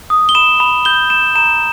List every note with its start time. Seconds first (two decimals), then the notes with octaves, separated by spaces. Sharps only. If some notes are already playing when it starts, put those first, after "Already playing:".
0.10 D#6
0.29 G7
0.35 B5 E7
0.60 B5
0.85 G6 G7
1.10 B5 E7
1.35 A#5 E7